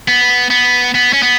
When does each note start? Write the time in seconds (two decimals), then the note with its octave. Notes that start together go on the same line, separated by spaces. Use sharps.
0.08 B3
0.50 B3
0.95 B3
1.13 C#4
1.23 B3